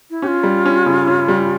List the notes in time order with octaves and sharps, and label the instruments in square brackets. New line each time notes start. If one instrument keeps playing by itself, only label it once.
[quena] E4
[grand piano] C#4 [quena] G4
[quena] F4
[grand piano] G3
C#4
C#3
C#4
G3